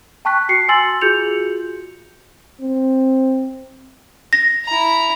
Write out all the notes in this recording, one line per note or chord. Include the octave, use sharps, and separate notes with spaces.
G5 A5 C#6 F#6 B6
F#4 C7 C#7
G#5 C6 E6 A6 F#7
F4 F#4 G#4 G6 C#7 F7
C4
A#6
E4 A#5